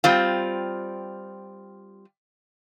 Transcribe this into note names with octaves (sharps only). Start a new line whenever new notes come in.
G3 C4 F4